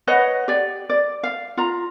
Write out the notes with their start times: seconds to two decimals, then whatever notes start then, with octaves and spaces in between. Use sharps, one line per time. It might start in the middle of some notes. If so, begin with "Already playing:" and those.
0.07 B4 C#5 D#5 F#5
0.48 G4 D5
0.90 D5
1.23 F5
1.57 F4 A#5